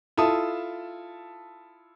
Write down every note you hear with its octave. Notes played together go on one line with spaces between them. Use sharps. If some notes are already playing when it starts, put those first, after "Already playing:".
E4 F4 A4 A5 D#6